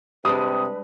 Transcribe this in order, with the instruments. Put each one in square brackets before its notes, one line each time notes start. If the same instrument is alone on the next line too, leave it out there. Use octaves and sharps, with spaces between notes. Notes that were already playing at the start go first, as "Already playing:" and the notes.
[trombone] C3 [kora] G3 G#3 D4 [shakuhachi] B4 [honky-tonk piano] D#6